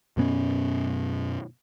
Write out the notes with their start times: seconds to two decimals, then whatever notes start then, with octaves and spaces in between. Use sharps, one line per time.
0.17 F#2 B2 B3 C#4